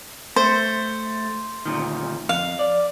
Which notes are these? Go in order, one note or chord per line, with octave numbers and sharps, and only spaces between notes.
A3 C5
D2 A#2 D#3
F2 F5
D5